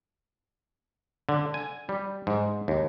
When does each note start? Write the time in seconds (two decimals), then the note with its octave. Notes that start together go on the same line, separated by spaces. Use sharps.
1.29 D3
1.54 G#5
1.89 G3
2.27 G#2
2.68 D#2